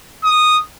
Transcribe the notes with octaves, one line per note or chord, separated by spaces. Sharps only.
D#6